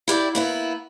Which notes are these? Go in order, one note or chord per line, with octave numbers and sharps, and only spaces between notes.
E4 G4 D5 E5
A#3 B3 E4